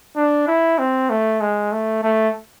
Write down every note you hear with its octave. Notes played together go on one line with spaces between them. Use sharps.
D4
E4
C4
A3
G#3
A3
A3